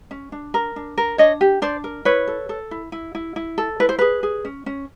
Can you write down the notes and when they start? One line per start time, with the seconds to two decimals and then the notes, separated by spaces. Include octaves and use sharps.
0.11 C#4
0.32 D4
0.54 A#4
0.76 D4
0.97 A#4
1.18 D4 C#5 D#5
1.41 G4
1.62 D4 C5 D5
1.84 A#4
2.05 E4 B4 C#5
2.27 A4
2.49 A4
2.71 E4
2.92 E4
3.15 E4
3.36 E4
3.58 A4
3.80 E4 B4
3.89 C5
3.98 G#4 B4
4.23 G#4
4.45 C#4
4.66 C#4